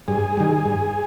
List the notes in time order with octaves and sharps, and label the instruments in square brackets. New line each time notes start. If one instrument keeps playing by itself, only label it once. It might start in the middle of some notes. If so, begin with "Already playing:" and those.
[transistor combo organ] G2 G#4
D#3 G3
G2